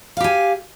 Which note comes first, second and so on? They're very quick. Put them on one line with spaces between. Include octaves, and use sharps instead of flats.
F5 G4 G#5